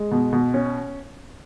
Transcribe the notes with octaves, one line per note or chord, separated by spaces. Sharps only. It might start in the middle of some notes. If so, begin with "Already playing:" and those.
Already playing: G#3
B2
B2
C#4